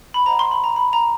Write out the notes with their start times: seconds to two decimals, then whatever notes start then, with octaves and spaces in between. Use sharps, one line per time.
0.14 B5
0.26 C5 D#5 F#5 A#5
0.39 C6
0.51 B5
0.64 A#5
0.76 B5
0.93 A#5